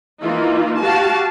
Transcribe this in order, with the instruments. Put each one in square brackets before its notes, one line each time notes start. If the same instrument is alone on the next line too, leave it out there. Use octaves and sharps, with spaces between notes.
[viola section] E3 A#3 D#4 F4
F#4 G4 F5 A5